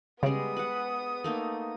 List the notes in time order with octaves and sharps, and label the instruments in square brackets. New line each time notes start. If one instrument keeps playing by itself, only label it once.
[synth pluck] C#3 [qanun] G3 G#3 [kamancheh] B3 D#6
[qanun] B4 F#5
A3 A#3 D#4